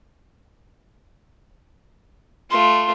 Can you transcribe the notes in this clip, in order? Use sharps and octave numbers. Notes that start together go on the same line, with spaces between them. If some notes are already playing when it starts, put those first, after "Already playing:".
A3 F4 C6